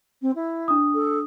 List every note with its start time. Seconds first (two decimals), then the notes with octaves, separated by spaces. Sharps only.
0.22 C4
0.35 E4
0.68 D4 D#6
0.95 A4